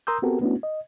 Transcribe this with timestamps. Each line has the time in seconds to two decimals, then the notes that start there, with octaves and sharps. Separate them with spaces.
0.07 A#4 A#5 C6 D#6 E6 G6
0.22 B3 C4 F#4 G4 A4 A#4
0.41 A3 B3 C#4 D4 E4 F#4
0.63 D#5